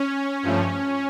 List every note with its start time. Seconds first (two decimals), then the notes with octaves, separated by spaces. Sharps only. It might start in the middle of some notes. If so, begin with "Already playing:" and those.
Already playing: C#4
0.43 G2 F3 A3